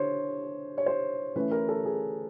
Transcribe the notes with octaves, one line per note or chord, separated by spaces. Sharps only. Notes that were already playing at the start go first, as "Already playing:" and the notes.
Already playing: D3 C5 C#5
C#5
C5
E3 A3 C#4 E4 B4
A#4
A4
G#4